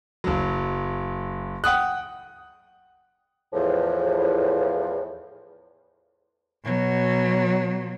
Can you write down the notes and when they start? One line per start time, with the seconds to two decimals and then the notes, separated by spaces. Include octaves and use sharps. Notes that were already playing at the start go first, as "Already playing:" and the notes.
0.24 F#1 F#3
1.64 F#5 G5 D#6 F#6
3.53 E2 A2 F3
6.65 B2 F#3